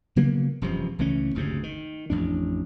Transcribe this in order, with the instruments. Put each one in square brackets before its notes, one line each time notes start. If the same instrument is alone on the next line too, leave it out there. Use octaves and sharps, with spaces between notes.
[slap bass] C#3 F#3 A#3 B3
E1 F#2 C3 F3
C#2 E3 A3 C#4
F#1 D2 G#2 C3
D#3
A1 F2 D4